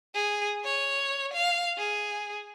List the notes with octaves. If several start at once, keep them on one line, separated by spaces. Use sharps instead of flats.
G#4
C#5
F5
G#4